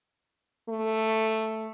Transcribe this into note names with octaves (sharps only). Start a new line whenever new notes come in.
A3